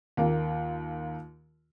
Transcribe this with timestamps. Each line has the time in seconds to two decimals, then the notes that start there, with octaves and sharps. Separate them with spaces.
0.17 D#2 A#3 F4